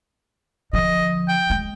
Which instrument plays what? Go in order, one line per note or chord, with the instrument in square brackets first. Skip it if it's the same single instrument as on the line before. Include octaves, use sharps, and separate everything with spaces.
[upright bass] D3 F3 [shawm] D#5
[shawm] G5
[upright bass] G#3